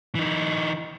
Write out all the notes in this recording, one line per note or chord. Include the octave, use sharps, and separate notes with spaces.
E3 D#4